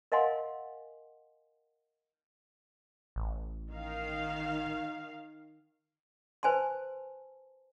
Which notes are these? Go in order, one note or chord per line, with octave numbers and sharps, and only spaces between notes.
A#4 D#5 F5 F#5 G#5 C6
A1
D#3 F5
B4 C5 G#5 A5 C6